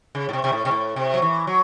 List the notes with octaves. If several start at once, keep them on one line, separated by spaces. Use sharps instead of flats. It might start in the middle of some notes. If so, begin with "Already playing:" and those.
C#3
A2
C3
C3
A2
C3
A2
C3
F#3
E3
F#3